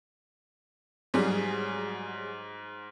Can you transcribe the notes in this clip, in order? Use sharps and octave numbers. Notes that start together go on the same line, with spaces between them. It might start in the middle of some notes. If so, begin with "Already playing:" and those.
G#2 F#3 G3 G#4